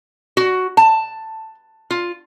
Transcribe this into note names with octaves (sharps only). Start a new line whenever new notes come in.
F#4
A5
F4